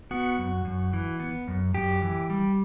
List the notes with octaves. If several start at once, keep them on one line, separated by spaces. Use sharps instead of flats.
B3 F#4
F#2
F#2
E3
B3
F#2
F#2 G4
E3
G3